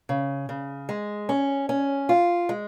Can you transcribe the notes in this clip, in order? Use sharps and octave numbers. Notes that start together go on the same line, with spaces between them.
C#3
C#3
G#3
C#4
C#4
F4
G#3